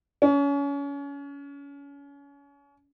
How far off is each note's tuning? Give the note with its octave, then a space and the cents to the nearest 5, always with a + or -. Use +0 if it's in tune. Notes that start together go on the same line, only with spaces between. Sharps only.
C#4 +30